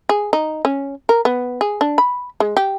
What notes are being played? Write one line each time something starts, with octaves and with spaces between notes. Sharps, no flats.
G#4
D#4
C#4
A#4
B3
G#4
D4
B5
G#3
G4